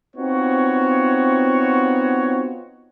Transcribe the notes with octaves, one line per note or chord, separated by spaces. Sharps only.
B3 C4 D#4 F4 F#4 C#5